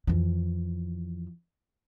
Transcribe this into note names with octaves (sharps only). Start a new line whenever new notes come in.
F2 E3